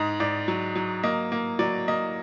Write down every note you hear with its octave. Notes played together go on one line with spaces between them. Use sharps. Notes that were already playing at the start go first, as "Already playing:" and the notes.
Already playing: G#2 D#5
G#2 D5
F#3
F#3
A#3 D#5
A#3
F#3 D5
A#3 D#5